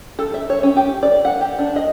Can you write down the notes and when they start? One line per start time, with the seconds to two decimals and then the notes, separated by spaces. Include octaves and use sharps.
0.19 A4
0.34 E5
0.50 C#5
0.63 C#4
0.76 G4
1.03 D5
1.25 F#5
1.41 G4
1.59 D4
1.76 D#5